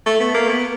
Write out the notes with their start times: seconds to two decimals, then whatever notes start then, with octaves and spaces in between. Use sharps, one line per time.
0.06 A3
0.20 B3
0.34 A#3
0.49 B3